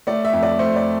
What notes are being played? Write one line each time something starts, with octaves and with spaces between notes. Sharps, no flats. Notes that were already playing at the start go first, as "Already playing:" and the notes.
A3 D5
E5
F2
D5
A3 C5
D5